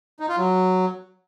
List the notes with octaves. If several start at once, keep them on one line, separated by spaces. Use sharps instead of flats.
D#4
F4
F#3